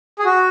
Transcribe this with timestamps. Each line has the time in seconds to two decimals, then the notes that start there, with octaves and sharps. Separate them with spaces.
0.19 G#4
0.25 F#4